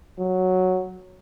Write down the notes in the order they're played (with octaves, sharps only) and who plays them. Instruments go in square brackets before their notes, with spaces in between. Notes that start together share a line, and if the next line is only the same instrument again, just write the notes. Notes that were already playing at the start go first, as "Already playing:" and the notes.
[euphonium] F#3